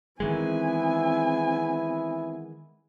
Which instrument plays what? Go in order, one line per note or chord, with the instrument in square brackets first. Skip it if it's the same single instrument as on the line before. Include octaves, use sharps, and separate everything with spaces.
[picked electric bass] D#3 E3 G#3 [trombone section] B3 E4 [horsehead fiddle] C4 G#5